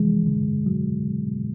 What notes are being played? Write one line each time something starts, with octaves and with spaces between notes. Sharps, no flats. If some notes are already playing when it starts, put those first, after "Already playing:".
Already playing: C3 E3 F3 G#3
D3
F#3